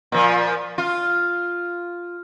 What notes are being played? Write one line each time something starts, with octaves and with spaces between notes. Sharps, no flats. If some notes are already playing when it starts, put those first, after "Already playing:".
A#2 F3
F4